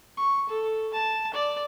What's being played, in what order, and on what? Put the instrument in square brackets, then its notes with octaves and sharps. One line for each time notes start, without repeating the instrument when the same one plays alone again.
[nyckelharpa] C#6
A4
A5
D5